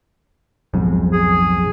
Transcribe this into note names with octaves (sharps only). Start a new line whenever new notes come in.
B1 F2 G#2
G#4